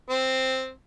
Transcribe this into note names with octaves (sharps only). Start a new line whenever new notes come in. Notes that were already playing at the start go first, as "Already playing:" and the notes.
C4